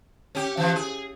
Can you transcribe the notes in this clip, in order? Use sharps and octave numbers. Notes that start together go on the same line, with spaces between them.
C#4 G4
E3 F3
G#4